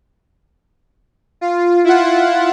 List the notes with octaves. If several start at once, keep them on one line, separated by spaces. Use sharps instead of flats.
F4
E4 F4 F#5